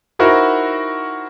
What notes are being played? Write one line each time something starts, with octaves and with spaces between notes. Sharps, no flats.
D#4 E4 F#4 A#4 C5 F#5